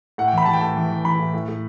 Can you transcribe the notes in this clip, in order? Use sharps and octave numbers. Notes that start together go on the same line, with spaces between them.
A2 F#5
G5
E3 B5
E3 A5
G5
A2 A5
E3
E3
E3 B5
A2
A2
A2